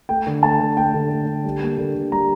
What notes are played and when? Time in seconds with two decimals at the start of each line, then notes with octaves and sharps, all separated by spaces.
0.09 A3 G5
0.27 D3
0.43 A3 A5
0.60 D3
0.77 A3 G5
0.94 D3
1.10 A3
1.27 D3
1.45 G3
1.62 A#3
1.78 D3
1.95 D3
2.12 G3 A#5